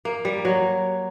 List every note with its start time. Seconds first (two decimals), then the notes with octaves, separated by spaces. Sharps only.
0.05 A#3
0.25 G3
0.45 F#3